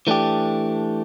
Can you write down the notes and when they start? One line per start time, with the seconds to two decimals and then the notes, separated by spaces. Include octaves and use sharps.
0.07 E3 A3 D4 G4